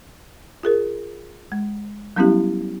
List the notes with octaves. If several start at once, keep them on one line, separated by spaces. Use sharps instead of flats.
F4 G#4 A#4
G#3
F#3 G3 B3 C#4 E4 G4